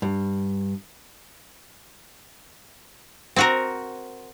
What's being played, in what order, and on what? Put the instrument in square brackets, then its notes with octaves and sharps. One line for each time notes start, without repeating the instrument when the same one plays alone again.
[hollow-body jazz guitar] G2
[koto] C4 F#4 A#4